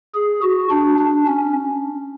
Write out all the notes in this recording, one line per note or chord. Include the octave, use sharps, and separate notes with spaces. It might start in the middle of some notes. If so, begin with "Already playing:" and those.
G#4
F#4
D4
D4
C#4